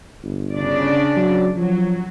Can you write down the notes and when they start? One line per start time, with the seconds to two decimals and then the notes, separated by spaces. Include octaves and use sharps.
0.23 G1
0.56 C#3 D4 D5
1.16 F#3
1.56 F3 F#3